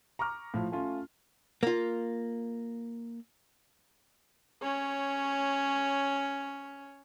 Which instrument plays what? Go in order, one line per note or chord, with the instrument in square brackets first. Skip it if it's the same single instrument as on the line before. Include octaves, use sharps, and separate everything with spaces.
[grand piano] A#5 C#6 D6 F6
A2 F3
A3 C#4 F4
[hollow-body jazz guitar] A#3 F4
[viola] C#4 C#5